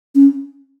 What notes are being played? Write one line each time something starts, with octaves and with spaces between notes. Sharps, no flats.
C#4